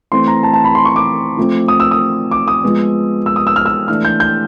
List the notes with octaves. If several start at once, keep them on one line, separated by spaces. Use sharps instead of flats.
E3 A3 C4 C6
A#5
A5
A5
B5
C6
C#6
D6
F3 A3 C4
D#6
E6
D#6
D6
D#6
F3 G#3 B3
E6
D#6
E6
F6
E6
E3 A3 D4 F6
G6
G6